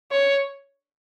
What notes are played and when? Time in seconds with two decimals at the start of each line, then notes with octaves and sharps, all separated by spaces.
0.11 C#5